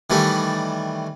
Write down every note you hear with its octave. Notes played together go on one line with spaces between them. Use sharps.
D#3 E3 G3 A3